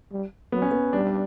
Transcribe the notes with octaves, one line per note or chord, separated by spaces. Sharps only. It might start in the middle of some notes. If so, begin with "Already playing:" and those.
G3
F#3 B3
C#4
B3
G3 D4